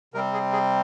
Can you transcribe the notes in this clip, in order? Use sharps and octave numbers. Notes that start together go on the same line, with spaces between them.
C3 G3 C4 A#4
G#4
G#4